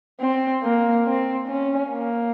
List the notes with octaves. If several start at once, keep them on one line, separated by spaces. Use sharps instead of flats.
C4
A#3
C4
C#4
A#3